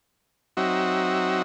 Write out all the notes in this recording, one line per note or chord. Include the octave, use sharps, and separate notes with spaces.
F#3 C4 D#4 F#4 E5